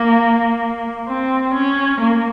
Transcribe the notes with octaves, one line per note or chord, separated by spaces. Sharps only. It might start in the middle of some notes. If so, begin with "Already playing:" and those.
Already playing: A#3
C4
C#4
A#3